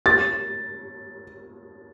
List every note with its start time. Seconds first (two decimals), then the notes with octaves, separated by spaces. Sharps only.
0.06 A6